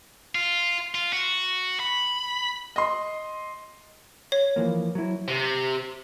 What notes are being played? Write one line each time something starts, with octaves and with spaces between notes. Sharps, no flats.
F4
F4
F#4
B5
D#5 C6
C#5
E3 F3 A#3
F#3 E4
C3